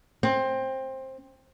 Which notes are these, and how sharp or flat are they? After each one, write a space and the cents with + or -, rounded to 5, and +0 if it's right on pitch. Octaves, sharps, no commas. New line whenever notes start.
C4 +15